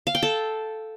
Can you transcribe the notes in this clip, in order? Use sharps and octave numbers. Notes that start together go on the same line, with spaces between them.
F5
G5
A4